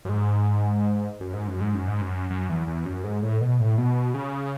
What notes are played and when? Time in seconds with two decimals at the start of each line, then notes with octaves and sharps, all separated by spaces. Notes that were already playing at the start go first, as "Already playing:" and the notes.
0.05 F#2
0.09 G#2
1.20 F#2
1.33 G#2
1.48 F#2
1.61 G#2
1.74 F#2
1.88 G#2
2.01 F#2
2.30 F#2
2.49 E2
2.67 E2
2.85 F#2
3.04 G#2
3.22 A2
3.41 B2
3.59 A2
3.78 B2
4.14 C#3